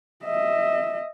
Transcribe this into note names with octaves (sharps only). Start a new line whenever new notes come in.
D#5 E5